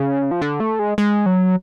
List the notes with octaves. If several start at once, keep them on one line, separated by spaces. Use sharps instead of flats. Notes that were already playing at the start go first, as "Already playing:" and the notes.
Already playing: C#3
F3
D3
A3
G#3
G#3
F#3